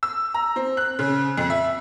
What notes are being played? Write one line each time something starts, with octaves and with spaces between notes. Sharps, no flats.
E6
A#5
C4
F#6
C#3
F2
E5